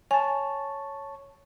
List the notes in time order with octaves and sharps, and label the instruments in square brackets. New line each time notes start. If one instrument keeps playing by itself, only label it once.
[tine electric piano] C#5 A5 [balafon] G#5